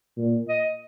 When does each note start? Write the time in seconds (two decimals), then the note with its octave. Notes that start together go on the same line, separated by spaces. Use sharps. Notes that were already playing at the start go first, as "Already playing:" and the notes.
0.17 A#2
0.49 D#5